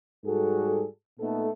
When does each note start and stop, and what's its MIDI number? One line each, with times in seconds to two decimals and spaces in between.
0.25 0.85 44
0.25 0.85 55
0.25 0.85 66
0.25 0.85 68
0.25 0.85 69
1.19 1.49 46
1.19 1.49 57
1.19 1.49 59
1.19 1.49 63
1.19 1.49 69